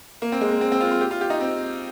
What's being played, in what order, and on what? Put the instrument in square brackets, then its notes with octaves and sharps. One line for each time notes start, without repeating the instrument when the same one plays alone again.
[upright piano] A#3
C4
G#3
A#3
C4
C4
F4
F4
G4
F4
G4
D#4
C4